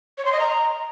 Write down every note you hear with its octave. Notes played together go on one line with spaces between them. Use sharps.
C#5
C6
D#5
A#5